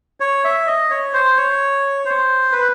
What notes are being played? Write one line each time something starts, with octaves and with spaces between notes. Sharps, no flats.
C#5
E5
D#5
C#5
C5
C#5
C5
B4